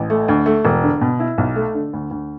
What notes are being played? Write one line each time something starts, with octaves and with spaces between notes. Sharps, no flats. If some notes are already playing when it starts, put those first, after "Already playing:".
Already playing: A1
A3
D2
A3
E1
D3
B2
E4
B1
A3
D3
D2
D2